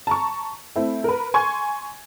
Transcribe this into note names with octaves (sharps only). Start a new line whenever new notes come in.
A5 A#5 C#6
A3 C4 E4
A#4 B4
G#5 C6 C#6 G#6